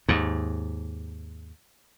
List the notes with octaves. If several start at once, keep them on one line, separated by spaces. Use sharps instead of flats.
D#2 G#2